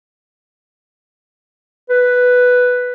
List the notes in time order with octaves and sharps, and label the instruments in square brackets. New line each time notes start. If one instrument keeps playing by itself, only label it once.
[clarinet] B4